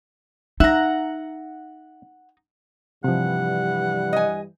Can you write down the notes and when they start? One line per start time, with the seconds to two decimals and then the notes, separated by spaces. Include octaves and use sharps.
0.60 D#4 E5 F#5 A#5
3.04 G2 C3 E3 F3 G3 F#5
4.13 D#5 G#5